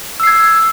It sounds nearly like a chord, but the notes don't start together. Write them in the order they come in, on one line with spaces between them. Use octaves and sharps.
E6 C7 G#6